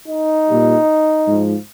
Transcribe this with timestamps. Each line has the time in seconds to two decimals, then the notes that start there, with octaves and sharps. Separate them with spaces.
0.08 D#4
0.48 A#2 G3
1.26 G#2 F3